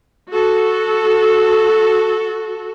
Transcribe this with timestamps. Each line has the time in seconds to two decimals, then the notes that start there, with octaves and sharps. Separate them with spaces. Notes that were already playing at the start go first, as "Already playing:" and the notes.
0.31 F#4 A4